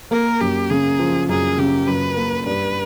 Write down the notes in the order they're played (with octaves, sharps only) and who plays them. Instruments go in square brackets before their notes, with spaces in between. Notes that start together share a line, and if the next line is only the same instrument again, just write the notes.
[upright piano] A#3 [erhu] A#4
[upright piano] F#2 [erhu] G4
[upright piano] C#3 [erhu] G#4
[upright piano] F3
[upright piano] F#2 [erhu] G#4
[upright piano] C#3 [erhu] G4
[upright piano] F#2 [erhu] B4
[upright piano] A#3
[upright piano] G2 [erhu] B4